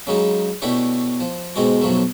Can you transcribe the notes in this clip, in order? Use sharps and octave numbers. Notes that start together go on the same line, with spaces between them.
C#3 F#3 G#3 D#4
B2 A3 D4 E4 G4 C#5
F3
G#2 B2 G#3 C4 F#4
B1 A2 F3 F#3 A3